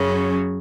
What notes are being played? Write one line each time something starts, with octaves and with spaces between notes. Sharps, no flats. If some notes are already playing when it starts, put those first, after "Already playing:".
Already playing: F#2 C#3 F#3 C#4